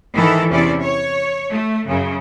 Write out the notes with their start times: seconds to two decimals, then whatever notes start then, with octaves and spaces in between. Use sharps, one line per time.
0.14 G#2 D#3 E3 E4 A4
0.49 E2 C3 C#4 E4 D5
0.83 C#5
1.51 A3
1.87 F#2 C#3